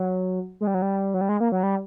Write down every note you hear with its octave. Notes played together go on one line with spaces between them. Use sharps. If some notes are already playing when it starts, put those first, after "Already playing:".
Already playing: F#3
G#3
G3
F#3
G3
F#3
G3
G#3
A#3
F#3
G3